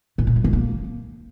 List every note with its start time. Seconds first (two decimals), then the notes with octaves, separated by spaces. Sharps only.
0.18 A2
0.27 A#2
0.36 F#3
0.44 A3
0.53 A#3